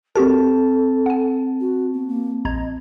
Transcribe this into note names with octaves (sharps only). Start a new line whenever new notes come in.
C4 F#4 G4 A4 A#4 A5
F#5 G#5
F#4
B3
A#3
A#1 D#5 A#5 G#6